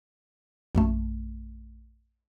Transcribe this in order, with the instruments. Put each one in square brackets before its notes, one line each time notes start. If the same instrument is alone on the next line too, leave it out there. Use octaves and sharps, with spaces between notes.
[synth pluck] A#1 F#2 A3